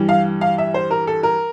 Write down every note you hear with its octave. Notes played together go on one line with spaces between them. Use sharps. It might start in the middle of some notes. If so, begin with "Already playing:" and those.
Already playing: G2 E3 G3
F5
F5
E5
C5
A#4
A4
A#4